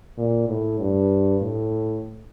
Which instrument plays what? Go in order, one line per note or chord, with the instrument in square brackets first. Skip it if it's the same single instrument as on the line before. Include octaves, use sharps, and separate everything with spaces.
[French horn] A#2
A2
G2
A2